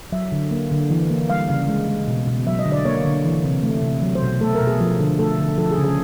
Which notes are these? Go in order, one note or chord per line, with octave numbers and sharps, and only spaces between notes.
F#3 E5
D3
A#3
D3
E3
A#3
G3 F5
C#3 F5
G#3
G#3
B2
B2
F#3 E5
D#5
D3
D5
A#3 C#5
D3
E3
C3
A3
C3
F#3
C5
B2
A3 A4
A#4
B2
G#4
F3
D3
A3 A4
D3
F3 A4
G#4
C#3
G#4